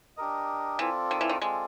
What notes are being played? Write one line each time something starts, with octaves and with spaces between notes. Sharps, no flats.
D4 G4 A#4 D#5
E3 C4 F4 A4 D5
D#3
E3
D#3
G#3 C4 F4 A4 D5